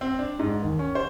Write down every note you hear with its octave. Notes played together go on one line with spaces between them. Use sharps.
C4
D4
G#2
D#2
C#4
C5